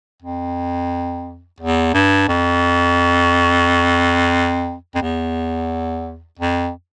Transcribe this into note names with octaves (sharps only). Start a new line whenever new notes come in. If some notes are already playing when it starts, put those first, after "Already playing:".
F2
E2
G2
F2
F2
E2
F2